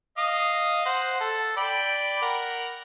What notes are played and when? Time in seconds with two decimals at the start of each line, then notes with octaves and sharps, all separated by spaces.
0.18 D#5 F5 D#6
0.86 C5 F#5
1.21 A4
1.57 D5 G5 B5
2.22 A#4 F#5